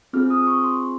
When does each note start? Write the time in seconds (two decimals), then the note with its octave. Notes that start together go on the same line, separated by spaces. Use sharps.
0.13 C4 F4 G#4 F6
0.30 D#6
0.47 C#6
0.64 C6